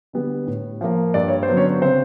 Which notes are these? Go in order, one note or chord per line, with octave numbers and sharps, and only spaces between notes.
D3 G3 B3
A2
F3 A#3
G2 D5
C#5
C5
D3 F#3 B3
C#4 C#5
C#3 C4 C5